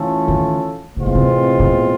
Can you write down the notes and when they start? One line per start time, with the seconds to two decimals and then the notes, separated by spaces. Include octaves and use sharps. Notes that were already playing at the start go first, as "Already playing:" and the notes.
Already playing: E3 A3 C#4 F4 A4
0.28 D#3
0.97 A2 C3 E3 G#3 C4 F4
1.06 B2
1.15 C3
1.60 C3
1.66 B2